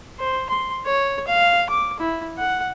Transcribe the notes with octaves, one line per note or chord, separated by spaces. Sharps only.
C5
C6
C#5
F5
D6
E4
F#5